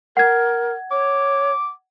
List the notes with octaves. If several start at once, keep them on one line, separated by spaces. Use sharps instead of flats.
A#4 F#5 G#6
C#5 D6